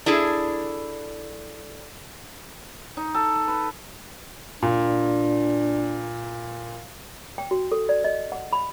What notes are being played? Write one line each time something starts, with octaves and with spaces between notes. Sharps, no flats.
D4 E4 G#4 A4
D#4
A4
B4
A#2 D4
G5
F#4
A4
D5
D#5
F#5
B5